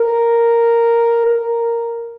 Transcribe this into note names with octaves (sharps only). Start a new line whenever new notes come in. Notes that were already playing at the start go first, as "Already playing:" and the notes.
Already playing: A#4
A#4